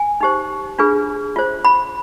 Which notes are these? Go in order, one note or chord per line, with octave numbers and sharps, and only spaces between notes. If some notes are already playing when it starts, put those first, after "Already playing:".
Already playing: G#5
D#4 G4 C5
D4 F4 G#4 B4
F4 C5
B5